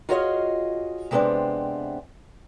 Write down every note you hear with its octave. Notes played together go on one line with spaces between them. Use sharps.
F4 F#4 G#4 C#5 D#5 F5
C3 G#3 A3 B3 C4 D4